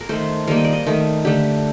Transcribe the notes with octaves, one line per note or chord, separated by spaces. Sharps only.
A#4
D#3 A3 C5
D#3 G3 A#3 F5
D#5
D5
D#5
D#3 A3
D3 A3 G4